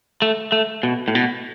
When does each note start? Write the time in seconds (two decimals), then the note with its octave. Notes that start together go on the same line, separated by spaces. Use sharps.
0.22 A3
0.52 A3
0.83 B2
1.08 A2
1.15 B2